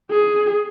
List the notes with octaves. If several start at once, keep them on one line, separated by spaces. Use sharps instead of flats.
G#4